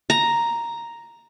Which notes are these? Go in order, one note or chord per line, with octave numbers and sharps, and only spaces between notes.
A#5